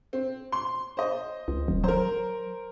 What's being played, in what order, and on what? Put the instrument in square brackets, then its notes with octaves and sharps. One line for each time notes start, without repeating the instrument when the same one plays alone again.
[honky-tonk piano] C4
C6
C5 D#5
[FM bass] C#2
D#1
[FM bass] F#3 [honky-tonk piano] A#4 C5